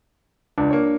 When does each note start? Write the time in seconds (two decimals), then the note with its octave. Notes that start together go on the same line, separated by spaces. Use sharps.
0.58 C#2 D4
0.70 A#3 C#5